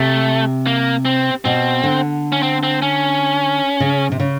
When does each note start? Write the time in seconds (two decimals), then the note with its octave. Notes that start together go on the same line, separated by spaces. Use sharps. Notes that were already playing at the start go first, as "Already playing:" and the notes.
Already playing: C3 A3
0.67 A#3
1.05 C4
1.45 B2 C4
1.84 D3
2.32 C#4
2.43 C4
2.63 C4
2.82 C#4
3.80 C#3
4.12 C3
4.20 C#3